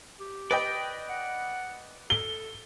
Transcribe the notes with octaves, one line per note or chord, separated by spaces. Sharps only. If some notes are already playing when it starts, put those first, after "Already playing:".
G4
B4 D5 D#5 G5
F#5
A4 G7